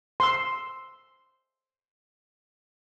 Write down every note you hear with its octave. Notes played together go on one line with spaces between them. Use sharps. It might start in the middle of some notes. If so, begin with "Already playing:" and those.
C6 E6